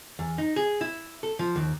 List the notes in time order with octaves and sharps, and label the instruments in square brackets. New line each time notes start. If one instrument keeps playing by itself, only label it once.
[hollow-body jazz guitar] E2
D#4
G#4
E4
A4
F3
D#2